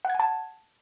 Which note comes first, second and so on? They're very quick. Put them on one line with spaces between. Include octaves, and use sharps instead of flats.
F#5 G#6 G#5 A5